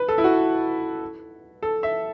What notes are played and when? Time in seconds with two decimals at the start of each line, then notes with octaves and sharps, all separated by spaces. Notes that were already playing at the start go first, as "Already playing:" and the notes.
Already playing: B4
0.08 A4
0.18 E4
0.24 F#4
1.63 A4
1.83 E5